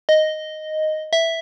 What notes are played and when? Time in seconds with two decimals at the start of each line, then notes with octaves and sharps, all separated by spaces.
0.09 D#5
1.13 E5